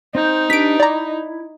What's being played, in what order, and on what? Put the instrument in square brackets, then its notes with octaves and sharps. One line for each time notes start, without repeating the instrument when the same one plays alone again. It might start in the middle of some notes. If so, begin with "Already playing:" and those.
[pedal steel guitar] C4 G6 [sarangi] D#4
[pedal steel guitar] D4 G4 B4 [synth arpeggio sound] B6 D7
[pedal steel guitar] E4 [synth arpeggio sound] D5 A#5